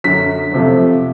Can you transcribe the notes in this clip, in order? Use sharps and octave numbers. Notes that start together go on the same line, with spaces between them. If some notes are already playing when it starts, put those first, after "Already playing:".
F#2 D3 F#3 B6
F2 C3 F3 A3